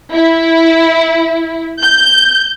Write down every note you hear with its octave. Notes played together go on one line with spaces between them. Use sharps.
E4
G6